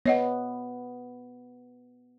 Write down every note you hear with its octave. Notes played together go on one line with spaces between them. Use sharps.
B3 C#5 D#5 F#5